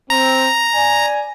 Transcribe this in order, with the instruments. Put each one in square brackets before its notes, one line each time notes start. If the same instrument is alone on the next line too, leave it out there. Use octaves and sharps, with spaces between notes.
[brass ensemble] C4 [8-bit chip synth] A#5
[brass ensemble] D5 G#5